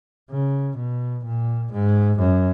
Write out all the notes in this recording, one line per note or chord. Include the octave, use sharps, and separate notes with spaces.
C#3
B2
A#2
G#2
F#2